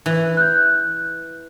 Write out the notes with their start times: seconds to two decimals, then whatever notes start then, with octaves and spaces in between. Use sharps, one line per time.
0.06 E3
0.37 F#6 G6